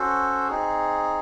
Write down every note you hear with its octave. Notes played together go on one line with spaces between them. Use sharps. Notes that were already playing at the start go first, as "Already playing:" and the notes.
Already playing: C#4 F#4 A4 C5
C4 D#4 G#4